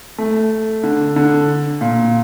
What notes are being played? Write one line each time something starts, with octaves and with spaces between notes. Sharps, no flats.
A3
D3
D3
A#2